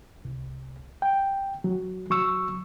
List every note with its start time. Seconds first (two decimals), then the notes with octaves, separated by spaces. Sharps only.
0.25 C2
1.02 G5
1.64 F#3
2.10 F#3 C#6 E6